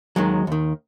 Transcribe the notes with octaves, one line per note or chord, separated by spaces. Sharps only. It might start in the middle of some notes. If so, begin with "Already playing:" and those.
D#2 D#3 F#3 G#3
D#2 D#3